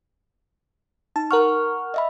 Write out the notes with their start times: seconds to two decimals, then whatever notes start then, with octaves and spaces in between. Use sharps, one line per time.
1.16 D#4 A5
1.31 A#4 F#5 C#6 F6
1.94 D#5 E5 B5